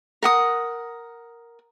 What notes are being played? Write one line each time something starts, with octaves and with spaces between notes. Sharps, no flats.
A#4 F#5 D#6